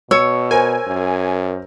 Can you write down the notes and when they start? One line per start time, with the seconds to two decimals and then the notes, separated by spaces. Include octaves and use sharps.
0.11 B2 C#5 E6 C#7
0.51 A#4 C5 G#5
0.87 F#2